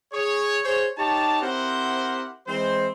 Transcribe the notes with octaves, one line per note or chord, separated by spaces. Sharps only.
G#4 C#5
G#4 C5 C#5
D#4 G4 C#5 A5
C4 E4 G4 A#4 C5 F#5
E3 G#3 C4 C5